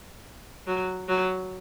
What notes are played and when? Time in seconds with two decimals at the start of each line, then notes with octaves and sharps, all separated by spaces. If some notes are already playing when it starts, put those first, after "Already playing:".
0.67 F#3
1.08 F#3